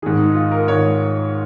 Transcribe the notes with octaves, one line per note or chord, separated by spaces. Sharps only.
G#2 D#3 G#4
D#4
F4
A#4
G#2 D#3 C#5